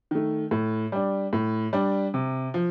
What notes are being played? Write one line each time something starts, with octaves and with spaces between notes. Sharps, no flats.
D#3 A3
A2
G3 D4
A2
G3 D4
C3
F3